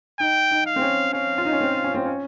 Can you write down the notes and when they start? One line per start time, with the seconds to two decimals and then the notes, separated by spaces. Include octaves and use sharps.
0.19 D#4 G5
0.51 D#4
0.66 F5
0.76 C4
0.82 C#4
1.13 C#4 F5
1.38 F4
1.45 D#4
1.53 C#4
1.61 C4
1.84 C#4
1.94 C4
2.06 C#4